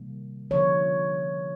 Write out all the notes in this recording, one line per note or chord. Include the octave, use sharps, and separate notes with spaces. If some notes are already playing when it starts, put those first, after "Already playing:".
Already playing: C3 D#3 G3 A#3
D3 F3 A#3 C#5